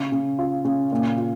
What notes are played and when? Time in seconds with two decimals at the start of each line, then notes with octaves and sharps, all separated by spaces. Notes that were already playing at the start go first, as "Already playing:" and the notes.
Already playing: C#3
0.12 C#3
0.39 F4
0.65 C#3
0.92 A#2
1.17 F4